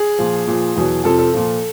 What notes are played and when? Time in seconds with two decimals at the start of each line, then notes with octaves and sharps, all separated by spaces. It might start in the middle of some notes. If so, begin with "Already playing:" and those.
Already playing: G#4
0.19 A#2 F3
0.47 A#2 F3
0.76 E2 B2 F#3
1.04 F2 C3 F3 A4
1.19 A4
1.34 A#2 F3